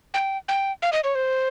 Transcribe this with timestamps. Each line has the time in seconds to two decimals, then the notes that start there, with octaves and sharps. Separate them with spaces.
0.14 G5
0.48 G5
0.82 F5
0.93 D#5
1.04 C#5
1.15 C5